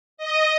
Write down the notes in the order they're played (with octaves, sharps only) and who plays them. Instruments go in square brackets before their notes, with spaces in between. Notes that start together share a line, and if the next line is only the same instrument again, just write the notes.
[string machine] D#5